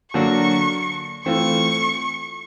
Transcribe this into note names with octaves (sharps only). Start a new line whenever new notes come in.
D3 F#3 A#3 D4 F#4 C#6
E3 A3 C4 F4 C#6